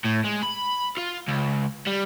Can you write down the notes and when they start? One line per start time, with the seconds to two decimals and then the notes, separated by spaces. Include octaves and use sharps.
0.04 A2
0.24 G#3
0.43 B5
0.98 F4
1.28 C#2
1.87 G3